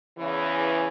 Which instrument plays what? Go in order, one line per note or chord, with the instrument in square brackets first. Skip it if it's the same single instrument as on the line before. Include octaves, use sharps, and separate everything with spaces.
[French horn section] E2 C#3 E3